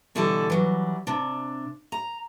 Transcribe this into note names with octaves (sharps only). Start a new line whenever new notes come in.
B2 D3 E3 G3 A4 A5
E3 F#3 G3
C3 D4
A#5